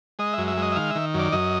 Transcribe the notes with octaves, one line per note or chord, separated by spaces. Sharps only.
G#3 D#5
F#2 E5
E5
G#3 D#5
E5
D#3 F5
D#3 E5
F#2
D5
F#2 D#5